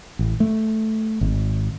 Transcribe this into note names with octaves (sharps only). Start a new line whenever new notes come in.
A1
A3
G#1